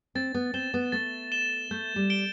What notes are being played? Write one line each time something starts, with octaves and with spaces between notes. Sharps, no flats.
C4 A6
B3
C4 E7 G7
B3
A3 A6
E7 G7
A3 G6
G3
D7 G7